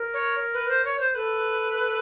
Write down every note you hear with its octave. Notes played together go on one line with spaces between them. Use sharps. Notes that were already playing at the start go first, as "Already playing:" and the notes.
Already playing: A#4
C#5
B4
C5
C#5
C5
A4 B4